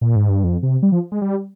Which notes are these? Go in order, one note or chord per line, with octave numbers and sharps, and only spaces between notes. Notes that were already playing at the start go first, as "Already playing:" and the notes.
A#2
G#2
G2
F2
C3
G3
F3
G#3
G3